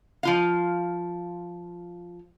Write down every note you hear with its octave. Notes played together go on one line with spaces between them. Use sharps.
F3 F4 F5